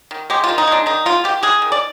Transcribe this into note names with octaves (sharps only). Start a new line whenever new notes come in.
D#3
G#3 G4
F4
D#3
D#4
G#3 D4
D#3 D#4
G#3 F4
D#3 G4
G#3 G#4
D#3
D5